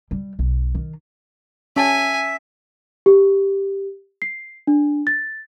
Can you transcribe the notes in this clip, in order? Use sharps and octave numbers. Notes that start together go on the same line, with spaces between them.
G3
B1
D#3
C#4 E5 G#5 A5
G4
C7
D4
A6